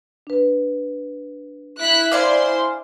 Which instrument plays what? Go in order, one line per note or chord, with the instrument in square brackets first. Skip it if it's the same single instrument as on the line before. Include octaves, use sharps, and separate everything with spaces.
[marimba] D4 B4
[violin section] E4 F#6 B6
[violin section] E4 C5 C6 [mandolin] D5 F5 G#5